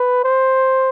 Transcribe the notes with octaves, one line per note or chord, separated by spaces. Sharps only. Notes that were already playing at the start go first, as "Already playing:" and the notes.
Already playing: B4
C5